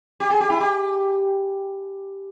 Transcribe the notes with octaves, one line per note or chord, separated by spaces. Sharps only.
G4
G#4
G4
E4
G4